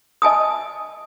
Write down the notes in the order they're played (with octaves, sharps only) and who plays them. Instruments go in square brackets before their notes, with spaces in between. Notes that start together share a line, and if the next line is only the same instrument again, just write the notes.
[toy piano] D#5 G#5 A5 D#6